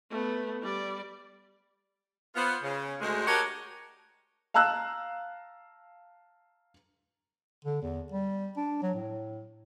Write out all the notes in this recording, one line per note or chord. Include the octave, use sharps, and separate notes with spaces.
A3 B3
G3 D5
B3 F4 C5
C#3
D2 G#3 C5
D4 F#4 G4 A#4 C#5 D#5
F5 A5 A#5 E6 F#6
D3
E2
G3
D4
F#3
A2